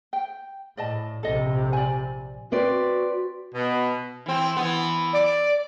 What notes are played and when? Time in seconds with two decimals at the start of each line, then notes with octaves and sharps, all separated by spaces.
0.13 G5
0.77 A2 D5 D#5 A5
1.23 A#1 C3 A4 D#5
1.73 D5 G#5
2.52 C4 F#4 B4 D5
3.55 B2
4.26 E3 C4
4.57 E3 B3
5.13 D5